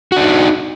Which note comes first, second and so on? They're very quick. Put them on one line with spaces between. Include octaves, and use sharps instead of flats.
F#4 D4 D#4